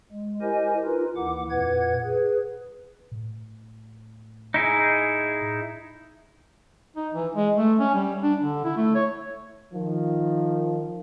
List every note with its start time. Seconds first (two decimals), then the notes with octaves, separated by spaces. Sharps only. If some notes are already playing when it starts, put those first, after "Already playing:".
0.12 G#3
0.41 E4 G4 A#4 C5 D#5 G#5
0.85 D#4 F4 A#4 B4
1.16 D#2 E3 E4 F#5 D6
1.50 F2 A#2 B4 F#5 G#6
2.03 G#4 B4
3.12 A2
4.54 D#4 E4 G#4
6.97 D#4
7.14 E3
7.36 G#3
7.57 A3
7.79 C#4
7.94 G3
8.22 D4
8.42 D3
8.64 E4
8.77 A3
8.95 C#5
9.73 D#3 F3